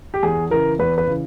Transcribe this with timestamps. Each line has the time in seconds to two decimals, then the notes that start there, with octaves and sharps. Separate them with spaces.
0.14 G4
0.23 E2 G#4
0.51 C#3 E3 A#4
0.79 E2 B4
0.98 B4
1.07 C#3 E3